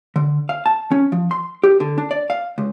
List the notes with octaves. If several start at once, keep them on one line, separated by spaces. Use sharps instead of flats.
D3
F5
A5
C#4
F3
C6
G4
D3
D4
D5
F5
C#2